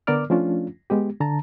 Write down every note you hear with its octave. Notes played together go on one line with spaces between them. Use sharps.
D3 B3 A#4 D5 D6 F6
F3 A3 C#4 D4 F4
G#3 B3 G4
D3 A5 A#5